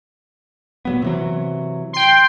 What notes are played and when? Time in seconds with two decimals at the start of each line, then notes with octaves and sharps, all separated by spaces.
0.85 A#2 F#3 B3
1.02 C3 E3 F#3
1.93 G5 C6